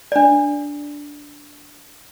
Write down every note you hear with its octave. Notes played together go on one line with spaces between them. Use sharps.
D4 D5